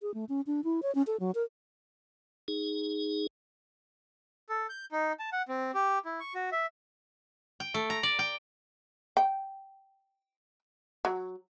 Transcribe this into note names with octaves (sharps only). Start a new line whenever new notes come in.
G#4
A3
C#4
D4
E4
C#5
C#4
A4
F#3
A#4
D#4 G#4
A4
G6
D#4
A5
F#5
C4
G4
E4
C#6
F#4
E5
G5
A3
A#5
D5
G5
G5
F#3